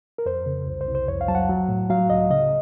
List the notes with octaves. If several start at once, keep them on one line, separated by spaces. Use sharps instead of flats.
A#4
F2 C5
C#3
C2
C5
C2
C5
F2 C#5
F5
F#3 A5
F#5
F#3
A2
F#3 F5
C#2 D#5
C#3 D#5